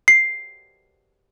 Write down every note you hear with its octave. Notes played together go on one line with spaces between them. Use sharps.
C7